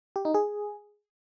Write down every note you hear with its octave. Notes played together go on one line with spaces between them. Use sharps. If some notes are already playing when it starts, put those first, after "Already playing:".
G4
D#4
G#4